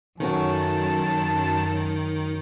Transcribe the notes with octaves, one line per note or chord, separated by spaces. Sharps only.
F#2 D#3 A3 C#4 F#4 A5